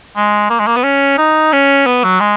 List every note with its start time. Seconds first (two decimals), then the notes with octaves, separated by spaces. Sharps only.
0.16 G#3
0.50 A#3
0.60 G#3
0.67 A#3
0.77 B3
0.84 C#4
1.18 D#4
1.53 C#4
1.87 B3
2.04 F#3
2.20 G#3